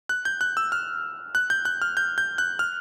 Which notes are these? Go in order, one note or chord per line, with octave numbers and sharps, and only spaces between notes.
F#6
G6
F#6
E6
F6
F#6
G6
F#6
F6
G6
G6
F#6
F6